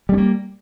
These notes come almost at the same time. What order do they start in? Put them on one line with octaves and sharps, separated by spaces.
G3 C#4 A#3